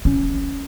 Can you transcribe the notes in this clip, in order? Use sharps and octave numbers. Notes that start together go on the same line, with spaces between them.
C#4